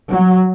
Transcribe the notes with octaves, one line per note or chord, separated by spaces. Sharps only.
F#3